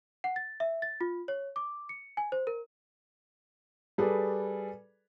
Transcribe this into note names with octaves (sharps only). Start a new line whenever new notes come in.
F#5
A6
E5
A6
F4
C#5
D6
C#7
G#5
C5
A#4
G3 G#4 A4 B4 D5